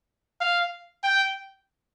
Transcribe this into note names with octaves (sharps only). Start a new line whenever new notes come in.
F5
G5